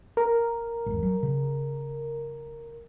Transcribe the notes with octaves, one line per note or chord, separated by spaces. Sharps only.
A#4
G#1 E2
F#3
C#3